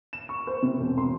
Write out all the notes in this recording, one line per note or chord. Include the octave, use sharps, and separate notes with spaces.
E7
C#6
C5
C3
E1
C6